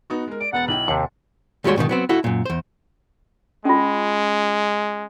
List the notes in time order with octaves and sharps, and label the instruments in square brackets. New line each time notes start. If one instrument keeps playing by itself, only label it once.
[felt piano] B3 D#4 F#4
G#3 A#4
[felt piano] D5 [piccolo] D7
[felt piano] E1 B3 A6 [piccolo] F#5
[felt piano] B1 E4 G5 [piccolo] F#7
[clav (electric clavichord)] D#2 C3 [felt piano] C#7
[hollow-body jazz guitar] D#2 G3 G#3 F#4 C#5 C6
G#2 B2 D3 D#3
F#3 B3 C4
E4 F#4 A4
F#2 A#2
E2 C5
[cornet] G#3 [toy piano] C#4 F4